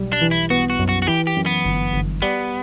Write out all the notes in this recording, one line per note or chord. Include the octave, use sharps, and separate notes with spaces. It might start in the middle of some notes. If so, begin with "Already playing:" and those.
Already playing: B1 G3
D4
E3
E4
B3 F#4
F#4
F#2
F#4
F#4
E3 G4
G4
F#2
B3
G1
G1
G3 B3